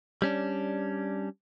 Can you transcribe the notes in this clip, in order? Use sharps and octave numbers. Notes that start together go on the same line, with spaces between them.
G3 C#4 D4